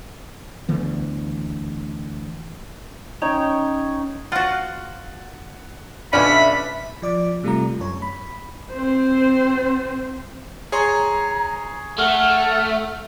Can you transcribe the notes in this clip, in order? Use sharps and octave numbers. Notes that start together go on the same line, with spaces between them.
D2 E3 B3
C#4 D#4 C#5 G5
F4 F#4 F#5 A6
B1 B2 C#4 D4 F4 E5 B5 C#7
F3 D5 D6
C3 G3 A3 F4 A#5
F#2 C#5
B5
C4 C5
G#4 C#5 A#5 C6
A3 F#5 F6